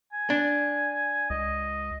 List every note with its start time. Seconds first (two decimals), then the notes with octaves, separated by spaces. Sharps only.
0.13 G#5
0.30 D4
1.30 C#2 D#5